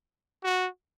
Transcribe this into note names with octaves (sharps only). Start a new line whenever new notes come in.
F#4